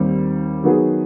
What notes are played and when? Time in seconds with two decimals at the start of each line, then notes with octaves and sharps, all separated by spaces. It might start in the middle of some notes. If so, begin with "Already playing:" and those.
Already playing: D#2 D#3 G3 C4
0.63 D#3 F#3 B3 D#4 G#4